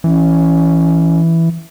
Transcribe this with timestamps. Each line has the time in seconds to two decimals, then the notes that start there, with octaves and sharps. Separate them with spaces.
0.04 E3 C#4